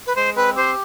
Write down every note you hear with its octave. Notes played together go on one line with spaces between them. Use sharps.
B4
G#3 C5
C4 B4
G4 C5